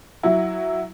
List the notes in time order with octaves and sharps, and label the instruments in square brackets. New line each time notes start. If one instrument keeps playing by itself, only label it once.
[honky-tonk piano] F#3 E4